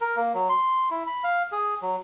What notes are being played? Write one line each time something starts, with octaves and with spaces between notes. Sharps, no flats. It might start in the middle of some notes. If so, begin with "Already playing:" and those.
A#4
A#3
F#3
C6
E4
B5
F5
G#4
F#3